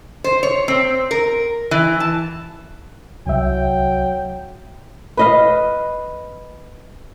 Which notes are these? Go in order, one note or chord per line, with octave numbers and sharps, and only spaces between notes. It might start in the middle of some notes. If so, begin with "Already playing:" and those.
C5
C#5
C4
A#4
E3
A5
C2 F#3 E5 G5
B4 D#5 F5